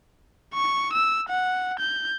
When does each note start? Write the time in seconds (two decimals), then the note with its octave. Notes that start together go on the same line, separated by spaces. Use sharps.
0.54 C#6
0.93 E6
1.28 F#5
1.79 G6